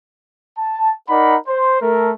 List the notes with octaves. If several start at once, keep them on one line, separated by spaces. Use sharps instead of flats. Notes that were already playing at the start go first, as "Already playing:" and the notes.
A5
D#4 A#4 D5 F#5 B5
C5
A3 A4 A#4